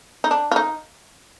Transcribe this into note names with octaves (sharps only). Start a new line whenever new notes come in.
D#4
D4
F4
D#4